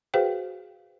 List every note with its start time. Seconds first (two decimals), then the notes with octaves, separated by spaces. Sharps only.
0.14 F#4 G#4 B4 C5 F5 G5